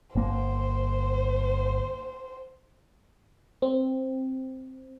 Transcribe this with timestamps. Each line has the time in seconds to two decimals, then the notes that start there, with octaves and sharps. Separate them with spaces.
0.15 G1 A#3 C5
3.62 C4